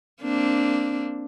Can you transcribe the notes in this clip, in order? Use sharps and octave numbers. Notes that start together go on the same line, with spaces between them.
A#3 C4 D4